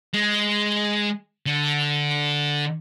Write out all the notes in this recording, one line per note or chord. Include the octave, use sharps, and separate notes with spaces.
G#3
D3